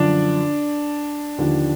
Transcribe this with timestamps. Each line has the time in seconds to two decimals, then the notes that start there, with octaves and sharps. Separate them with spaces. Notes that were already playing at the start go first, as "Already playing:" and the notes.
Already playing: F#2 D3 F3 D4 D5
1.38 D#2 D3 F3